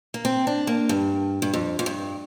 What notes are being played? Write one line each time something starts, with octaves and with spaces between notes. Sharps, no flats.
A#3
C4
D4
A#3
G2
G2
F2
F2
G2